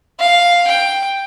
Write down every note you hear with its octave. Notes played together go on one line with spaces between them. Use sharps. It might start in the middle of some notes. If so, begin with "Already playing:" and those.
F5
G5